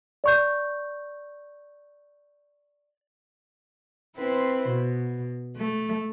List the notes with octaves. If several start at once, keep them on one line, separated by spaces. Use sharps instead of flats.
D5 C#6 G6
C4 E4 B4 C5
B2
A3